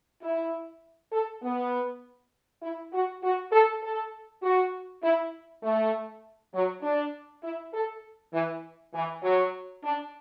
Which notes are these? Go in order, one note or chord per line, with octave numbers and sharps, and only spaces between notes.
E4
A4
B3
E4
F#4
F#4
A4
A4
F#4
E4
A3
F#3
D4
E4
A4
E3
E3
F#3
D4